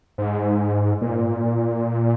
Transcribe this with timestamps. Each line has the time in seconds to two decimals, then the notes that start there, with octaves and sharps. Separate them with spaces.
0.18 G#2
1.01 A#2